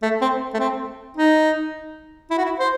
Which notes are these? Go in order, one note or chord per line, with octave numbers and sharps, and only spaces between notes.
A3
C4
A3
C4
D#4
E4
F#4
E4
C5